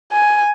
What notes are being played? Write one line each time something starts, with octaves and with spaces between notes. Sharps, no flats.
G#5